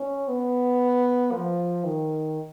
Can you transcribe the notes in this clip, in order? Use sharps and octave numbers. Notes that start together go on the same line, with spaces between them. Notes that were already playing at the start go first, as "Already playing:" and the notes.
Already playing: C#4
B3
F3
D#3